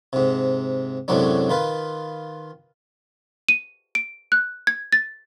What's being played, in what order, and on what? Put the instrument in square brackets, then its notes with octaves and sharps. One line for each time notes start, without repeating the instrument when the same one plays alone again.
[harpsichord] G#2 C3
F#2 A2 C3 F#3 G#3 D4
D#3 F4 B4
[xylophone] D#7
D7
F#6
G#6
A6